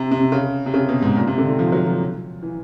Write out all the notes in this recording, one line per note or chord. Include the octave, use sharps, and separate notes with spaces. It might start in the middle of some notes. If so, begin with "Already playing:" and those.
Already playing: C3
C3
C#3
C3
C#3
B2
G#2
A#2
C3
D3
D#3
F3
F#3
F3
E3